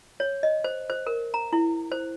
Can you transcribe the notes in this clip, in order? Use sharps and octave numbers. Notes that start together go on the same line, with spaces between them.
C#5
D#5
C5
C5
A#4
A#5
E4
C5